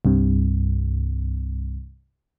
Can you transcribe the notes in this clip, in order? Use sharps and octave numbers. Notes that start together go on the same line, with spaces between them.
C2 G2 C3